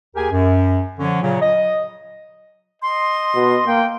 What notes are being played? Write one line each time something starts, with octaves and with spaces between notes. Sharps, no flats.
D#2 G4 G#4 A#4 G#5
F#2
D3 F3 C#4
A#2 C#3 F#3
D#5
D#5 C6
B2
A#3 G5